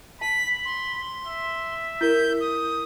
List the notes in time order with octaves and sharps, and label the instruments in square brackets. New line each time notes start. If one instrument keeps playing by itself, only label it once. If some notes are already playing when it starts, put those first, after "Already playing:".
[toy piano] A5 [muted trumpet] B5 [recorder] B6
[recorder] C6
[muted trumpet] E5
[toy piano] E4 A#4 [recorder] G6
[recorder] D#6